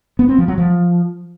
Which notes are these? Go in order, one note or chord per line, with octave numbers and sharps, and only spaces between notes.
B3
C4
F3
F#3
F3